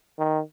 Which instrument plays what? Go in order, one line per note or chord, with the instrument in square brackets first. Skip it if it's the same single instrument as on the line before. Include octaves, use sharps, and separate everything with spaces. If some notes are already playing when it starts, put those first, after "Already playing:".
[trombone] D#3